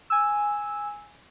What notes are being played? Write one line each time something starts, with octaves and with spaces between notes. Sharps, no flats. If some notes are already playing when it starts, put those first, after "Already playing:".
G#5 E6